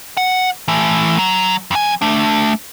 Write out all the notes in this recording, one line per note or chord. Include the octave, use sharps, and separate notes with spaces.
F#5
E3 A3
F#3
F2 G#5
A3 D4